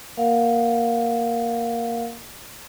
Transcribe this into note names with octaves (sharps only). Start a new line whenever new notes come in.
A#3 A#4 F5 F#5